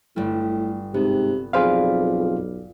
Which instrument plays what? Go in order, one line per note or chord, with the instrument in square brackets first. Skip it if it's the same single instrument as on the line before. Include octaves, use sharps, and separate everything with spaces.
[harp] G1 G3 [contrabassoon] A2
[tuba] G#2 [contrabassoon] C3 [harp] B3
[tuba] B1 [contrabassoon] F2 [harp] F4 B4 D5 [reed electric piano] G#4 C5 F5